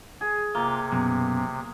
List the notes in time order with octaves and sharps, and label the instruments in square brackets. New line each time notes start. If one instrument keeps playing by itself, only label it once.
[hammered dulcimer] G#4
[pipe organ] C3 [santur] A#3 [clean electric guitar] F4
[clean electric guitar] F#2 B2